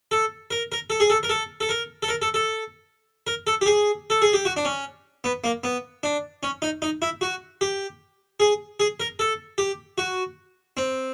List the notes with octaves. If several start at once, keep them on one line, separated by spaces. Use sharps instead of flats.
A4
A#4
A#4
A4
G#4
A4
A#4
A4
A4
A#4
A4
A#4
A4
A4
A#4
A4
G4
G#4
A4
G#4
G4
F#4
D4
C#4
B3
A#3
B3
D4
C#4
D#4
D#4
E4
F#4
G4
G#4
G#4
A#4
A4
G4
F#4
C4